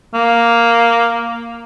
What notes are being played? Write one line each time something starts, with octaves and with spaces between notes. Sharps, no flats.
A#3